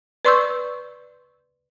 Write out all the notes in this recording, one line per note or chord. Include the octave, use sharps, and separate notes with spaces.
B4 D5 C6 C#6 E6 G6